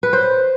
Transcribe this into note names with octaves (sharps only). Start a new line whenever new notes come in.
B4
C5